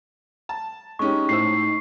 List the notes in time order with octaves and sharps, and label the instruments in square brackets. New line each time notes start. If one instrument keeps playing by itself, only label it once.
[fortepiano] A5
[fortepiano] G#3 C#4 G4 [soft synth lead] D#4 [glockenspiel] C#6
[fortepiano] A2 C5 E6 [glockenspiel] C7